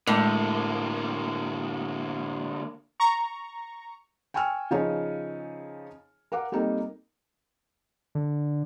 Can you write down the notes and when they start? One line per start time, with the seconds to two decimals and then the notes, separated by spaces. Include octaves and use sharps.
0.07 A2 D3 G#3 A#3 A#4
3.00 A#5 C#6
4.34 G5 G#5 C#6 E6 F6
4.71 C#3 F3 D#4 G#4 C#5
6.32 A#4 F5 F#5 D6
6.52 G3 A#3 C4 D#4 A4
8.15 D3